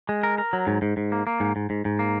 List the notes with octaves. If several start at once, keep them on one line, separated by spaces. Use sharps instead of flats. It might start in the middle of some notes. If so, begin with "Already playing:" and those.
G#3
A#4
A#4
F#3
G#2
G#2
G#2
A#3
A#3
G#2
G#2
G#2
G#2
A#3